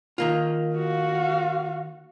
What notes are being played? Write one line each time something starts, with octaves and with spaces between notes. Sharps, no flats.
D#3 A#3 F4
F#4 F5